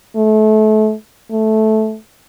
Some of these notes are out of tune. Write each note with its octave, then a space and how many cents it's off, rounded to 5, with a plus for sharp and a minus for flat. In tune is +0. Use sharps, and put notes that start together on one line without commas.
A3 -30
A3 -10